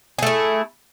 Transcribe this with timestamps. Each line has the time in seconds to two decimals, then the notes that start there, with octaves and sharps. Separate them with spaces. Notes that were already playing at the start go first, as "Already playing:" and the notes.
0.19 G#4
0.23 A3
0.27 E4